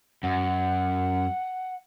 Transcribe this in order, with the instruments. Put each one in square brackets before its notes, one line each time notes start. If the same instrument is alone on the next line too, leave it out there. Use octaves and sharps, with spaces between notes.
[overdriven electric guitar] F#2 [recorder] F#5